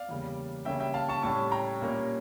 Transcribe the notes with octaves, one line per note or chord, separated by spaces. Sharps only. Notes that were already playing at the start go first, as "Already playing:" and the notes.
Already playing: D5 F5
E2 C#3 G3 A#3
C#3 G3 A#3 C#4 E5 G5
E5 G5
F5 A5
A5 C#6
A2 G3 C#4 A5 C#6
G5 A#5
A#2 G3 A#3 C#4